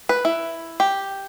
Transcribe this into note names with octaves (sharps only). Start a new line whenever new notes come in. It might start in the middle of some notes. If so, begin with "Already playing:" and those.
B4
E4
G4